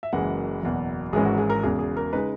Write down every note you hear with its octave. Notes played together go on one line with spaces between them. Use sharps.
E5
F#1 F#2 E3 G#3 F#5
F#1 E2 B2
G#1 G#2 E3 G#3 C#4 G#4
F#4
G#4
A#4
E1 E2 C#3 G#4
G#4
A#4
C#3 G#3 D#4 B4